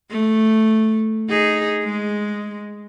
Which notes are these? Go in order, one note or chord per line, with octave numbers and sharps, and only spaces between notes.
A3
D#4 G#4
G#3